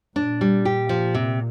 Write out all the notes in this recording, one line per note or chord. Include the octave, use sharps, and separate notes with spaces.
A#2 D4
G3
G4
F3
C3